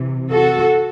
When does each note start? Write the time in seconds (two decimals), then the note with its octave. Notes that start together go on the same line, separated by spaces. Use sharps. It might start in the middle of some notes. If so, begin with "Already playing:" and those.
Already playing: C3 E3
0.31 F#4 A4